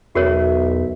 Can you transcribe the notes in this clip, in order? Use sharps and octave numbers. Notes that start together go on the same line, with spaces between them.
B1 E2 F#4 A#4 C#5 E5